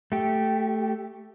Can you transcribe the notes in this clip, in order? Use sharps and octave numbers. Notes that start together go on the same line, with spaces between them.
A3 G4